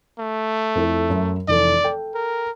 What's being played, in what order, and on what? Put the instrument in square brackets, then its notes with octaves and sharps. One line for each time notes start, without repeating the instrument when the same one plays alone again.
[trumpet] A3
[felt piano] F2 E4 A4
F#2 E5
[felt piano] F1 E3 A4 [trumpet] D5
[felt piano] A4 G5
[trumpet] A#4